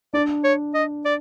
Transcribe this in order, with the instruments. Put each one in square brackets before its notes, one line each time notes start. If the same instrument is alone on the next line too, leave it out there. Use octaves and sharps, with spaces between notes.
[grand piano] D4 [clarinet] D5
[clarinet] C#5
D#5
D5